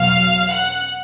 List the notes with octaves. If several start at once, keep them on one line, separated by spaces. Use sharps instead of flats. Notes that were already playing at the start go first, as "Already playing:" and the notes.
Already playing: E2 B2 F#3 F5 F6
F#5 F#6